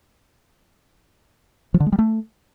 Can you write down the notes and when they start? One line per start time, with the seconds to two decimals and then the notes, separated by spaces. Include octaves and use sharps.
1.74 F3
1.80 D3
1.86 G#3
1.92 G3
1.99 A3